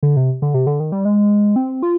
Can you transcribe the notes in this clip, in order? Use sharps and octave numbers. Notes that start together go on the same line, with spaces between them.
D3
C3
D3
C3
D3
D#3
G3
G#3
C4
F4